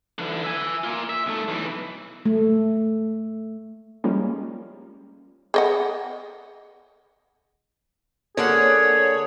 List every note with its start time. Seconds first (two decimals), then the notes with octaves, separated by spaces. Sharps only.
0.19 D3 E3
0.44 E5 G#5
0.84 A#3 F4
1.09 E5
1.26 B1 A3
1.48 B1 E3
2.26 A3
4.04 F3 G3 G#3 A#3 C#4
5.54 G#4 D#5 F#5
8.37 D3 A#3 G#4 C#5 F#5